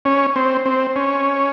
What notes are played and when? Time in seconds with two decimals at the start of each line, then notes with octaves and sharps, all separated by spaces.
0.05 C#4
0.36 C4
0.66 C4
0.96 C#4